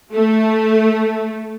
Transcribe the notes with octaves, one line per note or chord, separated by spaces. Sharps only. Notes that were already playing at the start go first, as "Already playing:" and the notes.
A3